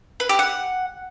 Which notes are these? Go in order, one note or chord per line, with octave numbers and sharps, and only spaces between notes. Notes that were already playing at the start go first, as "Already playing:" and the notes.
B4
G4
F#5